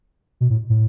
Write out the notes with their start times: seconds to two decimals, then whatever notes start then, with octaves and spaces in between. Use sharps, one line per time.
0.41 B2
0.50 A2
0.70 A2